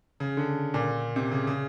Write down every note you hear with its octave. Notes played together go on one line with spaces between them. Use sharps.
C#3
D3
A#2
C3
C#3
C#3